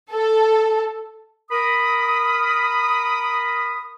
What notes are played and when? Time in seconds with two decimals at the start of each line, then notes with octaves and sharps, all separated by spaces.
0.12 A4
1.51 A#4 B5 D#6